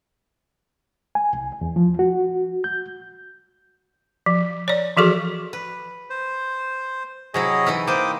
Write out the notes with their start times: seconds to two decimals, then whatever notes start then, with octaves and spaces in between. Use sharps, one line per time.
1.15 G#5
1.33 C2
1.61 E2
1.76 F3
1.99 F#4
2.64 G6
4.26 F3
4.68 C#5 D5
4.97 E3 F3 F#4 G#4 A4 C#6
5.53 B4
6.10 C5
7.34 C3 F#3 E4 G#4 C#5 D#5
7.66 E3 D#4 E4
7.87 A#3 C5 G5 D6 D#6